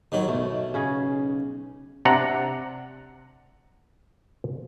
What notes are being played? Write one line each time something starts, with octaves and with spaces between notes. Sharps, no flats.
D#2 D#3 F#3
B1 A3
C#3 C#4 G#4
C3 D4 F#5 A#5